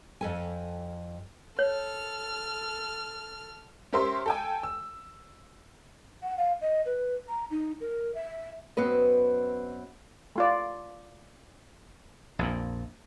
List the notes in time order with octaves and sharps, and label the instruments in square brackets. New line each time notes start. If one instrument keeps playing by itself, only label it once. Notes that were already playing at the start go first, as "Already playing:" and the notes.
[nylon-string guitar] F2 A4 G#5
[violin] A4 F6 [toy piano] C#5
[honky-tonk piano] C#4 G4 A#4 C5 E5 C6
A4 G5 G#5
E6
[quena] F#5
F5
D#5
B4
A#5
D#4
A#4
E5
[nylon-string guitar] F#2 B3 C4 B4 D#5
[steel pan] A3 F4 D5
[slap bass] A#1 F2 A#2